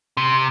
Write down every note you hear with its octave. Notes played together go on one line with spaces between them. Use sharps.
C3